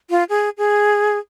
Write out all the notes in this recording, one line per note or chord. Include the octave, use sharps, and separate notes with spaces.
F4
G#4
G#4